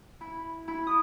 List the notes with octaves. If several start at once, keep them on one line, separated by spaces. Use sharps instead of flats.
E4
E4
D#6